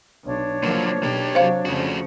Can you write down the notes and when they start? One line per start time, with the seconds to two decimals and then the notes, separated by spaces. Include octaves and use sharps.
0.24 B1 D4 C#5
0.63 C#2 F3 F#3 A#3
1.03 B1 B2 A#3 G4
1.35 C3 F#3 C5 F5
1.65 F2 C#3 F3 A3 F#4